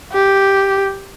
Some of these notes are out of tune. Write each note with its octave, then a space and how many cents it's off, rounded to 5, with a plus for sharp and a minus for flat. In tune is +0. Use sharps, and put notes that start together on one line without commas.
G4 +0